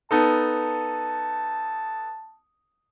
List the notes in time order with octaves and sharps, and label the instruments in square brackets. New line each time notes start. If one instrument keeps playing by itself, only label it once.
[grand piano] B3 D#4 A4 [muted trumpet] A5